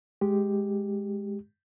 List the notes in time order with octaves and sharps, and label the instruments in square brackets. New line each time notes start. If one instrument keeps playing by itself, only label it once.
[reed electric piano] G#3 G4